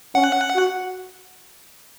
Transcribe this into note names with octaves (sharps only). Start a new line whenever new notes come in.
C#4 F#5
F#4